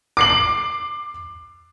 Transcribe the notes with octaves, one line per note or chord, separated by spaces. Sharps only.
D6 C7 F#7